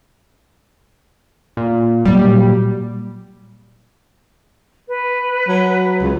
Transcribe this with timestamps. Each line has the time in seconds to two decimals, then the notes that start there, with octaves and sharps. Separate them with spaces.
1.57 A#2
2.05 A#2 F#3 G3
4.88 B4
5.48 F#3
6.01 C#2